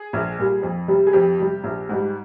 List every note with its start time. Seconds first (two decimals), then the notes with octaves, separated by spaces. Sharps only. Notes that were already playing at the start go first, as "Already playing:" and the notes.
Already playing: G#4
0.13 A#1
0.39 A#2 G3
0.63 F2
0.88 C3 G3
1.07 G#4
1.13 F2 G4
1.39 C3 G3
1.64 A#1
1.89 G#2 G3